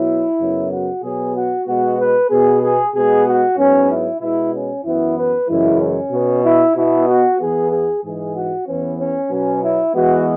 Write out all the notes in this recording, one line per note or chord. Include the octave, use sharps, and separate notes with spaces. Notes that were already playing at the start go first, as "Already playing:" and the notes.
Already playing: B2 F#3 B3 E4
F#2 C#3 F#3 B3
F#4
B2 F#3 B3 G#4
F#4
B2 G#3 B3 F#4
B4
B2 B3 G#4
G#4
B2 G#3 B3 G#4
F#4
G#2 F#3 B3 C#4
E4
B2 G#3 B3 E4
C#4
F#2 E3 B3 E4
B4
F#2 C#3 E3 G#3 E4
C#4
B2 B3
E4
B2 B3 E4
F#4
E2 E3 B3 G#4
G#4
G#2 E3 G#3 G#4
F#4
E2 E3 B3 C#4
C#4
B2 F#3 B3 C#4
E4
E2 E3 G#3 B3 F#4